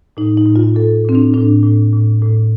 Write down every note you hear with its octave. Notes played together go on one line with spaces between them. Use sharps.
A2 D#4
D#4
A2
F4
A2 A4
A2 C4
D4
A2 D4
A2
A2
A2